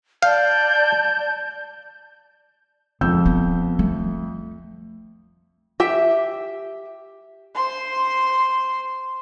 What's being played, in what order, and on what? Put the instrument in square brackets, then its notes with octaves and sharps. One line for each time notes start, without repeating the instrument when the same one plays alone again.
[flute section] D5 A5 [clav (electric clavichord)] F5 [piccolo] G6
[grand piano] F2 E6 G6 [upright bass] G#3
[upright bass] B3
A3
[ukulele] G4 E5
[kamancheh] C5 C6